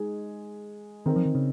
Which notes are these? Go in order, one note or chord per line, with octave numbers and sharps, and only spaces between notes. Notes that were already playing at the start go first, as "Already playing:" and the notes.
Already playing: G#3 D#4 G#4
D#3 C4 D#4 A#4
F3
D#3
C#3